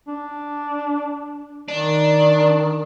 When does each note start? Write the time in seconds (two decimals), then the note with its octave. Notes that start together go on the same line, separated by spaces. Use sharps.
0.07 D4
1.69 D#3 D4